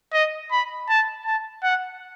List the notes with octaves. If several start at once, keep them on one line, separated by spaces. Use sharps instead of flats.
D#5
B5
A5
A5
F#5